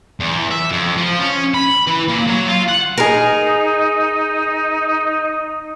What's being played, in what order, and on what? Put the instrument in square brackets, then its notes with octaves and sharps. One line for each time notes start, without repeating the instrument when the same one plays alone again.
[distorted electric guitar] E2
E5
F2
F3
C#4
B5
E3
A#2
F#3
F4
F#5
[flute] D#4 [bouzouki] G#4 A#4